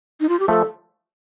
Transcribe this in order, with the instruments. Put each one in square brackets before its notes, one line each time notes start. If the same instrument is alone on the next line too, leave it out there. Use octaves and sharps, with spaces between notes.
[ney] D#4
F4
G4
[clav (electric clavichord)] F3 A3 [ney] A4